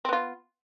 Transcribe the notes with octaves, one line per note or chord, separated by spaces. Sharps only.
B3 C4 F4